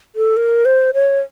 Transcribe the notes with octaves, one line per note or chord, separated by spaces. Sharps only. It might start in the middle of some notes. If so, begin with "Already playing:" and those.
A4
A#4
C5
C#5